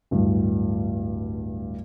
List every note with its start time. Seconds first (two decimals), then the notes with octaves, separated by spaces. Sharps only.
0.11 D1 G2